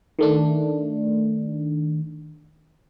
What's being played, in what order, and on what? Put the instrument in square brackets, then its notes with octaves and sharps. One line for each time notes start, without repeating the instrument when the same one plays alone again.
[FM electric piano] D#3 A3 D4